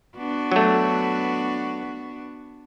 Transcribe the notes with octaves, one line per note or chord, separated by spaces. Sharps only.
B3 D4 F#4
F#3 A3